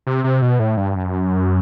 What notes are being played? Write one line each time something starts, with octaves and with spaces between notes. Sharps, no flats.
C3
C3
B2
A2
G2
F#2